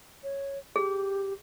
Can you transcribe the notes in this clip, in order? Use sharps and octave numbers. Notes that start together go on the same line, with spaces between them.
C#5
G4 G#4